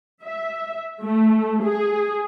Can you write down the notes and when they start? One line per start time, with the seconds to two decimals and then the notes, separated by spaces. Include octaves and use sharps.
0.23 E5
1.04 A3
1.63 G#4